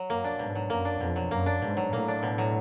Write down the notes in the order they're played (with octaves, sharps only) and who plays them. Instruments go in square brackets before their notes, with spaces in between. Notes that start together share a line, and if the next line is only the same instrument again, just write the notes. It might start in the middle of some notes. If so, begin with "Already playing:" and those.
Already playing: [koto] F#3
[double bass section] F#2 [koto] A#3
[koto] D4
[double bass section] G#2 [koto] B2
[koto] F#3
[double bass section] F#2 [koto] A#3
[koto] D4
[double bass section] F2 [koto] B2
[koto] F#3
[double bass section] F#2 [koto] A#3
[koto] D4
[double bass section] G#2 [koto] B2
[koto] F#3
[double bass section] A2 [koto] A#3
[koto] D4
B2
F#3